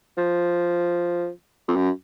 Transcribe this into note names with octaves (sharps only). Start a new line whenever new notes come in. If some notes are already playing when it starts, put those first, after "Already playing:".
F3
F2
F#2